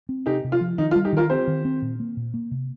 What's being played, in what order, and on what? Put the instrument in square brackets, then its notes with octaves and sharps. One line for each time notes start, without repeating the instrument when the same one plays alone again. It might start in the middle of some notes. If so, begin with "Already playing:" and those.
[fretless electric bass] C4
[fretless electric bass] C3 [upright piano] D#4 G4
[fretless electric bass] C3
[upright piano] F4
[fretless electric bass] F3
[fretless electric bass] D#3 [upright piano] D#4
[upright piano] F4
[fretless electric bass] G3
[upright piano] D#4 G4
[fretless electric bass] D#3 [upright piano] F4 A#4
[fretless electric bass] C4 [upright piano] G4 C5
[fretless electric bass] D#3
C4
A#2
A#3
A#2
A#3
C3